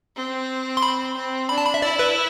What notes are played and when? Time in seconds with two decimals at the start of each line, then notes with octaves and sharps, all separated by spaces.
0.16 C4
0.77 C6
0.83 B5
1.16 C4
1.49 D4 B5
1.58 A5
1.65 B5
1.74 E5
1.82 E4 D5
1.99 B4